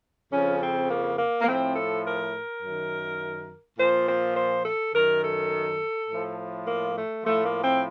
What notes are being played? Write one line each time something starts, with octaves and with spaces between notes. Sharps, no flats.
F2 C#3 F3 C#4
C4
A#3
A#3
A#3
A2 F3 C4
A4
A#4
F#2 D#3
A#2 F3 C5
C5
C5
A4
F#2 D#3 A#4
A4
A2 F3
A#3
A3
A2 F3 A3
A#3
C4